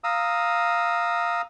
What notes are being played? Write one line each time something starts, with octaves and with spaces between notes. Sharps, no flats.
F5 A#5 D#6 E6